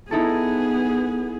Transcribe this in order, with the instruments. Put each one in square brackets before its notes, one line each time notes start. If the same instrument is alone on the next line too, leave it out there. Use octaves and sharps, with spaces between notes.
[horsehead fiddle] B3 G#4 [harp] D#4 E4 A4